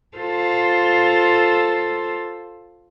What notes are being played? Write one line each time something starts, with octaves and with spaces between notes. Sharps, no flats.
F4 A4 C5